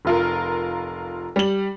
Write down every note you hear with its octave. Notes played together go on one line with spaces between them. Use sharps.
F1 F4 A#4
G3 F#7